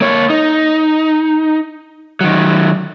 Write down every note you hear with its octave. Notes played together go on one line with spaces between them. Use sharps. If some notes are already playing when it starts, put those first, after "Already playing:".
A#3 C#5
D#4
D#3 F#3